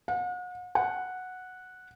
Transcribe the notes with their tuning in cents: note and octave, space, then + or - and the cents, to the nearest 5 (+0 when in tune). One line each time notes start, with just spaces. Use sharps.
F#5 -40
F#5 -5